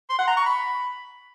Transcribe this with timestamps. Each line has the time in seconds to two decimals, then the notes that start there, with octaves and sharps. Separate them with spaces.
0.09 C6
0.19 F#5
0.28 A#5
0.37 C#6
0.46 B5